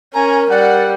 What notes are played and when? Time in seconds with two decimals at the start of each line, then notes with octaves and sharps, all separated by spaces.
0.14 C#4 A#4 G#5 A#5
0.50 G3 D5 F#5